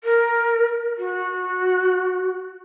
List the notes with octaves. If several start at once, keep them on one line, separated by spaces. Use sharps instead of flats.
A#4
F#4